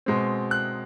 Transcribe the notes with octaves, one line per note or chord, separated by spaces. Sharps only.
B2 G#3 C4
F#6